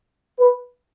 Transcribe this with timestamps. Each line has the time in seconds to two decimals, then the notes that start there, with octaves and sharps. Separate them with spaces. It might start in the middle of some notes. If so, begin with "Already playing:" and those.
0.39 B4